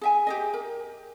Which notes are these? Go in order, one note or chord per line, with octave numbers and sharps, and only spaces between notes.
G#4 E5 G#5
G4 G#4 D#5
A#4